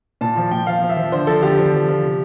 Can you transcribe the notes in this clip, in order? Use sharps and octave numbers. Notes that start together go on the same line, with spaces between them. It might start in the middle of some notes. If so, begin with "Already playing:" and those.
A#2 A5
F3 A5
A#2 G5
F3 F5
F3
E5
F3
D3 C5
F3 A4
D3 G4
F3
F3
F3
C3